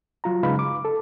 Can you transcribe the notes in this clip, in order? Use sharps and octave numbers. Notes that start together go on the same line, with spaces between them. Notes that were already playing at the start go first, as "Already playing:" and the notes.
F#3 F4 A#5
C#3 G#3 D#4 B4 F5 B5
D6
A4